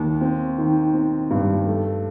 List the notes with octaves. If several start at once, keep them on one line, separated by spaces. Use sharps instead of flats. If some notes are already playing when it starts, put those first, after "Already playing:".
Already playing: D#2
C4
D#3
C4
G2
A3